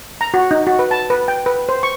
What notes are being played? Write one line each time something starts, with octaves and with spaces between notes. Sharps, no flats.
A#5
F#4
D#4
F#4
B4
A5
B4
G5
B4
C5
C#6